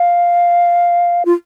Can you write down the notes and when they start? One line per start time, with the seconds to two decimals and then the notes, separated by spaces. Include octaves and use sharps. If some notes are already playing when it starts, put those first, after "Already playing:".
Already playing: F5
1.25 F4